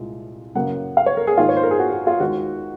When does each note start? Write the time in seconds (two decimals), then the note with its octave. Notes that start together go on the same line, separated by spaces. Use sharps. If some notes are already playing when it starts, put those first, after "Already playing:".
Already playing: C2 A#2 G#3
0.55 F#2 C#3 F#3 A#3 F#5
0.97 F5
1.06 C#5
1.17 A#4
1.27 G#4
1.38 G#2 D#3 A#3 D#4 F4
1.49 C#5
1.57 C5
1.63 A#4
1.71 G#4
1.79 F#4
1.92 F#4
2.07 F4
2.20 D#2 D#3 G#3 D#4 F#4